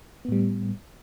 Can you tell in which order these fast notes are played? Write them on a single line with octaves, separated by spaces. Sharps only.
B3 A2 G3